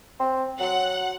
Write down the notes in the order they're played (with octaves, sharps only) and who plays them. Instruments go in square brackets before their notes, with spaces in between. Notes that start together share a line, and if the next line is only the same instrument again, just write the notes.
[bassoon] C4
[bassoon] F#3 [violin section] F#5